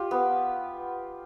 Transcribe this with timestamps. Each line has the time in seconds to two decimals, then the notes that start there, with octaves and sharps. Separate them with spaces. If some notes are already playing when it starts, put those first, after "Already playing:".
Already playing: F4 G4
0.11 B3